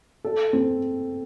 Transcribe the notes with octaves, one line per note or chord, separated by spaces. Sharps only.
A4
C4